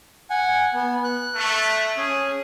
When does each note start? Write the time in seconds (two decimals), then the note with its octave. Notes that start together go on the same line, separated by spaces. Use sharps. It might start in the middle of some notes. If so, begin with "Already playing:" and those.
0.30 F#5 G#5
0.74 B3
1.04 F#6
1.35 A3
1.97 C#4 G#4